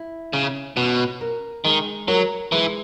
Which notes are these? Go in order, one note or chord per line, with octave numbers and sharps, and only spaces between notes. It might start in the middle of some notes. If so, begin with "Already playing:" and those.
Already playing: E4
C#3 C#4
B2 C#4
A#4
D#3 G#3
F#3 A#4
E3 G#3